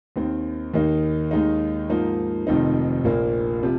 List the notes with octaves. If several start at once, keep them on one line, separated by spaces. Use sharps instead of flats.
D#2 D#3 C4
D#2 D#3 A#3 D#4
D#2 D#3 G#3 D#4
G#2 F3 A#3 D#4
F1 F2 D#3 C4 D#4
A#1 A#2 A#3
C3 F3